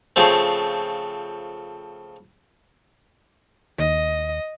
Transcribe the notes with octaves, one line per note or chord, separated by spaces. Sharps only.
C#3 F3 A3 C4
D#2 D#5